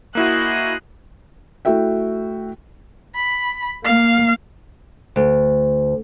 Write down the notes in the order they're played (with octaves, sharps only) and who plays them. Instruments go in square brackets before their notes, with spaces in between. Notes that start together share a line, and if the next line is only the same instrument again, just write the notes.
[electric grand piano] A#3 E4 F#4 [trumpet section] G#4 C5 D#5 [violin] F#6
[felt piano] A3 E4 F#4 E5 G5
[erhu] B5
[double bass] A#3 [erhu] F5
[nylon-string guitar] D2